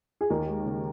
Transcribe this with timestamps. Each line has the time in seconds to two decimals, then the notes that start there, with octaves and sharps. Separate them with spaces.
0.21 G#4
0.30 D#2 A#4
0.48 G#3
0.66 C#3